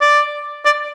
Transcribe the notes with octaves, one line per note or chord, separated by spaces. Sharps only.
D5
D5